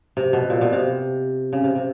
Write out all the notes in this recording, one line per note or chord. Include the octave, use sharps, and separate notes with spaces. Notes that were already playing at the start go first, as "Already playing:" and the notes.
C3
B2
A#2
B2
C3
C#3
C3
C3